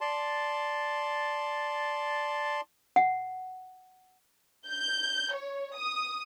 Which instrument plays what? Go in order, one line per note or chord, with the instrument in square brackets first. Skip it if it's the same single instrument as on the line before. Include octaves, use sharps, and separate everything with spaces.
[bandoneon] D5 A5 C6
[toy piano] F#5
[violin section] G6
C#5
D#6